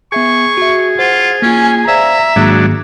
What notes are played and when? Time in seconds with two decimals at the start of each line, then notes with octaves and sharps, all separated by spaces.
0.12 B3 G#4 E5 G#5 C#6
0.57 F#4 E5
0.99 F4 C5 F#5
1.42 A#3 C#4 F4 G#5
1.88 C5 D5 E5 F5 A#5
2.36 G#2 D#3 F#3 G#3 A#3 D4